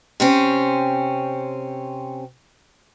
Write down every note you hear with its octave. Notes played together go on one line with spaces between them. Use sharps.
C3 C4 C#4